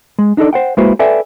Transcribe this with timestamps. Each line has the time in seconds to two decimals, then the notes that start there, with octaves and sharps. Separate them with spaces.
0.19 G#3
0.37 D4 D#4 F#4 A4 D5
0.53 C5 F#5 G5
0.77 G#3 A#3 E4 F#4 B4 C5
0.99 A4 B4 D5 E5 G5 G#5